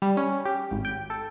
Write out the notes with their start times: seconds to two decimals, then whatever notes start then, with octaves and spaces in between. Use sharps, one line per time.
0.02 G3
0.17 C#4
0.45 G4
0.71 G#1
0.85 G5
1.10 A4